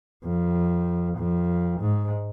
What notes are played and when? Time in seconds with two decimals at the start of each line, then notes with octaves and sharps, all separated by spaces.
0.24 F2
1.18 F2
1.81 G#2